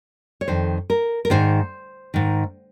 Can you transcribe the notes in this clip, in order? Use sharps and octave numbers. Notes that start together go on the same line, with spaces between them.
C#5
F2 D#3 C5
A#4
A#4
G#2 D#3 C5
G#2 D#3